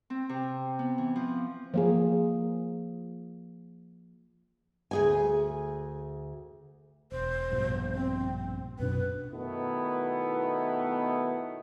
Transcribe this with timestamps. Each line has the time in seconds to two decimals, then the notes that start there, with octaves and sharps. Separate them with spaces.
0.10 C4
0.29 C3
0.79 B3
0.98 E3
1.16 F3
1.74 F3 A#3 G#4
4.91 D2 G#4 G#5
7.12 E1 C5
7.51 A#1 G2 B2
7.95 C4
8.79 F#2 B2 D4 B4
9.32 B2 D#3 A3 B3 D#4 E4